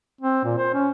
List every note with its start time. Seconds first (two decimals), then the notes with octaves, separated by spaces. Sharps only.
0.21 C4
0.44 A#2
0.58 C5
0.74 C#4